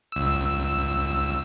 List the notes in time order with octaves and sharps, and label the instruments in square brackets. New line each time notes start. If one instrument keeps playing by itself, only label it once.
[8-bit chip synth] C#2 E6